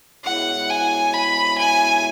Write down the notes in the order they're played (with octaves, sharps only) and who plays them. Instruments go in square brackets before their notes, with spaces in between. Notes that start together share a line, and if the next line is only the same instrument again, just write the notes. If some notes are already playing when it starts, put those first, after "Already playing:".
[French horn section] B2 G#3 E4 C#5 [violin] F#5
[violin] G#5
B5
G#5